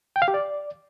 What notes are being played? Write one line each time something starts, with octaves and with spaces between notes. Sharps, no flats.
G5
F5
G4
D5